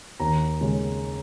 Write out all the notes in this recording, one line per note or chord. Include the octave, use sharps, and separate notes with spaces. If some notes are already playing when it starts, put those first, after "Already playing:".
D#2 A#5
C#3 G#3